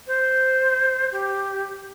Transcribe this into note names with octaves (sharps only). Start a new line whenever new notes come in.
C5
G4